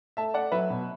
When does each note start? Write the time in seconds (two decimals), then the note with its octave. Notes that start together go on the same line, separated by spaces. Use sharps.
0.17 A3 E5 A5
0.34 A3 D5 F#5
0.52 F#3 B4 E5
0.70 B2